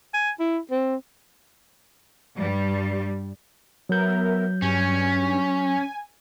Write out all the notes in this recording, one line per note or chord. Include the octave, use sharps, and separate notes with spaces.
G#5
E4
C4
G2 G3
F#3 B3 A#4 E5 G6
G2 C#4 G#5
G#5